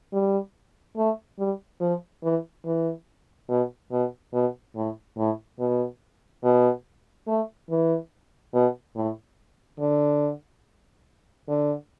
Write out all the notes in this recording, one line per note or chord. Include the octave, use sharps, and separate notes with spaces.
G3
A3
G3
F3
E3
E3
B2
B2
B2
A2
A2
B2
B2
A3
E3
B2
A2
D3
D3